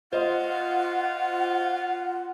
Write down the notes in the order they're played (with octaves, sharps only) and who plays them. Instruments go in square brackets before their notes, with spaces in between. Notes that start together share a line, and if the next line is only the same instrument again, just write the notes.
[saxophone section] F4 [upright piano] C5 D#5 [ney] F#5